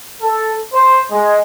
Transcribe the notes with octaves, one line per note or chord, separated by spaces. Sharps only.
A4
C5
G#3